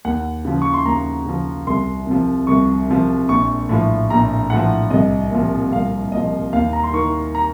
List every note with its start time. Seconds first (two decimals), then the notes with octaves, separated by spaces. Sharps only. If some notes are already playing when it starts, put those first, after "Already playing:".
0.05 D#2 F#5
0.45 C#3 F3
0.62 C#6
0.74 C6
0.85 D#2 A#5
1.25 C#3 F3
1.67 C2 C6
2.07 C3 F3
2.47 C2 C#6
2.88 C3 F3
3.29 A#1 C#6
3.69 A2 F3
4.10 A#1 A#5
4.50 A2 F3 F#5
4.90 C2 D#5
5.31 A#2 F3
5.72 C2 F5
6.12 A#2 F3 D#5
6.53 D#2 F5
6.73 A#5
6.83 C6
6.93 D#3 C#6
7.35 A#5